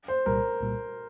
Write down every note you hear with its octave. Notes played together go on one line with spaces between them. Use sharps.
C5
C2 A#2 G3 A#4
C2 A#2 G3